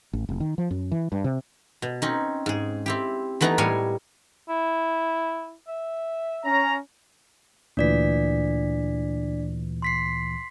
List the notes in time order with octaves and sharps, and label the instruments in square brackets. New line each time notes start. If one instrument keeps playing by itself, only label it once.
[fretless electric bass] A1
F1
D#3
F3
F#2
E3
G2
C3
[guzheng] B2
C4 C#4 D#4
G#2 G#4
C4 E4 G4
E3 A3 B3 D#4 E4 A#5
A2 G3 A#4 C#5 F5 G#5
[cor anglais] E4
E5
[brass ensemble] C#4 A#5
[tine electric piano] D2 A#2 E3 [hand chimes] D4 D5 B6
[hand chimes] C6 B6 C7